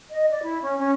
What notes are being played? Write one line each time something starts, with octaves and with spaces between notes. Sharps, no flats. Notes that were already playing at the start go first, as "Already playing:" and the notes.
D#5
D5
E4
C#4
C#4